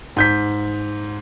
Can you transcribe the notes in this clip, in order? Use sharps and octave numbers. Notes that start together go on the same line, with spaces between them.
G#2 G6 B6